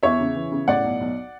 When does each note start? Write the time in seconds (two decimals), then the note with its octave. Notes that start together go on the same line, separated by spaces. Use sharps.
0.03 E2 C#5 E5
0.20 C#3
0.36 E3
0.52 C#3
0.68 A2 D5 F#5
0.84 B1
1.01 B1